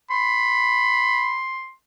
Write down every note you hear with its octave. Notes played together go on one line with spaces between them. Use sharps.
B5 C6